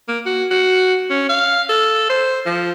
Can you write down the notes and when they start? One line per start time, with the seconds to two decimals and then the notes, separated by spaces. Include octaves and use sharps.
0.08 A#3
0.26 F#4
0.51 F#4
1.10 C#4
1.29 F5
1.69 A4
2.10 C5
2.46 F3